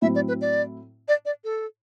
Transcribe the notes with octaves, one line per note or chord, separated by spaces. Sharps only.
A2 F#3 C4 E4 E5
D5
B4
D5
D5
D5
A4